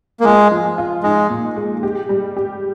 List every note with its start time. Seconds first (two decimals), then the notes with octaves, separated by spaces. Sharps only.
0.20 A#3
0.24 G#3 F4
0.51 F3
0.78 F4
1.03 G#3 D#4
1.30 A#2
1.56 G#3
1.83 G4
2.09 G3
2.37 G4